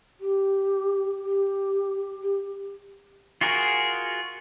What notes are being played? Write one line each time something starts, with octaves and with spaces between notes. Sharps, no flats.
G4
G4
G4
F4 F#4 G#4 A#4